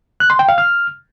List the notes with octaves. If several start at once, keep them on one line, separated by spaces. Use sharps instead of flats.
F#6
C6
G5
F5
F6